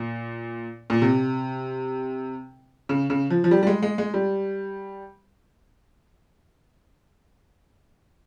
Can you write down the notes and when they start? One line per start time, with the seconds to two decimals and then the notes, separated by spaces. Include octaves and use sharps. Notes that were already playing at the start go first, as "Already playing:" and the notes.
Already playing: A#2
0.90 A#2
1.02 C3
2.89 C#3
3.10 C#3
3.30 F3
3.44 F3
3.51 G3
3.63 G3
3.67 G#3
3.83 G#3
3.98 G#3
4.14 G3